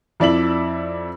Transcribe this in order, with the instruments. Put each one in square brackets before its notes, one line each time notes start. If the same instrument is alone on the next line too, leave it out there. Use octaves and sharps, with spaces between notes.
[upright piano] F2 E4 D5 E5 F#7